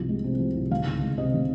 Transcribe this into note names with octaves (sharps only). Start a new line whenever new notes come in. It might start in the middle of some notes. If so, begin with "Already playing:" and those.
Already playing: C2 F3
G#3
C3
F3
C2
D#3 F5
C#2
G#3
C3 D#5
D#3